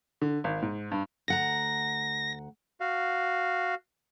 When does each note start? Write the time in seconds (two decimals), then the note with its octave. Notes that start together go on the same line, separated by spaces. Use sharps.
0.22 D3
0.44 G#1
0.62 G#2
0.92 G2
1.28 D2 F#5 A#5 A#6
2.80 F#4 F5